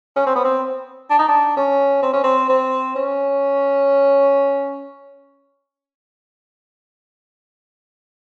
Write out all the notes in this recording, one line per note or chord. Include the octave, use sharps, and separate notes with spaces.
C#4
C4
B3
C4
D4
D#4
D4
C#4
C4
C#4
C4
C4
C#4